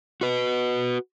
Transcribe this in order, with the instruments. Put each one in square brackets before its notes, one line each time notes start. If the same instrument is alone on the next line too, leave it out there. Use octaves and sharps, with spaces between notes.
[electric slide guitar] F#4 B4